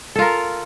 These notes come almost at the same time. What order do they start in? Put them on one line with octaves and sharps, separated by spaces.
A4 F4 A#4